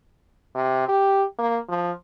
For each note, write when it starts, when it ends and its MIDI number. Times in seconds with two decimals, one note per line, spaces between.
0.55 0.87 48
0.88 1.24 67
1.38 1.58 58
1.68 1.91 53